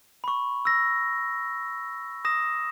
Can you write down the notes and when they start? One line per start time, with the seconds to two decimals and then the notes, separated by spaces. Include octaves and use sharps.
0.24 B5 C#6
0.65 E6 A#6
2.25 D#6 A#6 E7